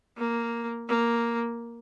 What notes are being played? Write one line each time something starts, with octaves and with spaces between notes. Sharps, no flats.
A#3
A#3